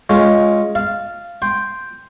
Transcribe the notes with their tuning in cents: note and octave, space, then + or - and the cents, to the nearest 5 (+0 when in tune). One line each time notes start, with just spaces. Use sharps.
G#3 +5 C#4 +0 F4 +15
F5 -15 A5 +0
G5 +0 C6 +0